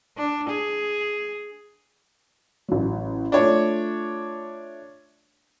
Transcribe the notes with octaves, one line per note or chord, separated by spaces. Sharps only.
D4
G#4
A1 F#3
A3 D4 F4 C#5